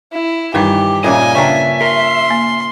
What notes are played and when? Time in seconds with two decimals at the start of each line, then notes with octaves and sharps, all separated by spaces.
0.13 E4
0.54 G2 D#3 E3 G3 G4 C#5
1.04 A#2 C#3 A#3 D#5 E5 G#5 D6
1.35 C#3 C#4 D4 E5 G5 A#5
1.81 A#4 C6
2.30 A#3